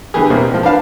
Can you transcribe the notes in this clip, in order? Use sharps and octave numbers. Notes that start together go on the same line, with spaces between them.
D3 E3 G3 B3 G4 G#4
E2 B2 G3 A#3 C4
A2 F3
D4 B4 F5 A5